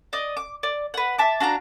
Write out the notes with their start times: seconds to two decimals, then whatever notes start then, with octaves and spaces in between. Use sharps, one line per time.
0.13 D5 D#5
0.37 D6
0.63 D5
0.94 B4 F#5
1.18 E5 A5 D6
1.40 D4 F#4 F5 A#5